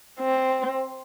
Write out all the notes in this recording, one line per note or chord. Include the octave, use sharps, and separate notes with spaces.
C4